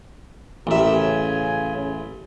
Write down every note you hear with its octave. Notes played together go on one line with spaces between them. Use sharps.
A1 G4 A#4 E5
C#3 G#5